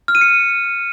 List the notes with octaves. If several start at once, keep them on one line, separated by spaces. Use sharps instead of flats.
F6
D#7
C#7